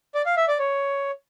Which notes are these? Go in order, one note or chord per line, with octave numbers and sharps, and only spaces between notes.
D5
F5
E5
D5
C#5